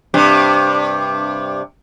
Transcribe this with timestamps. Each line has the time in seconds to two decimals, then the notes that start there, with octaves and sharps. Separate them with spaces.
0.14 G2 C3